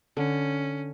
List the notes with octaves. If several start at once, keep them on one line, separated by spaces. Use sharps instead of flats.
D3 C#4